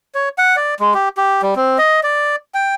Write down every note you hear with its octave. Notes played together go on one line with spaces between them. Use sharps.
C#5
F#5
D5
G#3
G4
G4
G3
C4
D#5
D5
G5